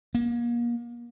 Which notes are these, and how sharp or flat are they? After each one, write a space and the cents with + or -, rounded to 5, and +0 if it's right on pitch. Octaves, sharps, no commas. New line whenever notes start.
A#3 +35